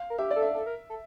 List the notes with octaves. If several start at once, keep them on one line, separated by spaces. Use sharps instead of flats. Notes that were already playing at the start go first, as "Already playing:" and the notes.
Already playing: F5
A#4
G4 E5
D5
A4
E5
A4
A#4
A4